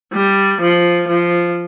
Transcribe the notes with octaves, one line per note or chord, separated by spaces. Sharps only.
G3
F3
F3